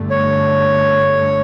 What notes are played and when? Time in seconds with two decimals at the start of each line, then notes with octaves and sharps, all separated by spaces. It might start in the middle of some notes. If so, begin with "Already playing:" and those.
Already playing: G1 G2 D3 A3
0.10 C#5